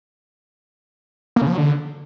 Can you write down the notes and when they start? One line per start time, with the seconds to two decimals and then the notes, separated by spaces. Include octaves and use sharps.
1.36 A#3
1.42 C#3
1.47 F3
1.52 F#3
1.58 D3